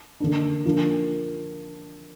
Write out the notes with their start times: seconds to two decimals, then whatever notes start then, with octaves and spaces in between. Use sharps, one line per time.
0.20 D3 A#3 D4
0.65 F3 A#3 D4